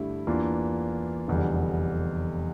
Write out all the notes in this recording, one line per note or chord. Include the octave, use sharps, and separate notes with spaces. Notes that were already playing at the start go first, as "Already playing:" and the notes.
Already playing: G2 D3 A3 E4 G4
E2 E3 A#3 D4 F4
F1 E2 D3 G3